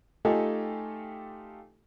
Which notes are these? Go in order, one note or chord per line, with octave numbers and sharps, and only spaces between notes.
A3 D#4 F4 G4 A4 G#5